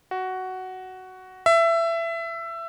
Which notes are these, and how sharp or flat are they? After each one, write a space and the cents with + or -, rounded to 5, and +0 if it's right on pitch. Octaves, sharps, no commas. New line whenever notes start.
F#4 +10
E5 +20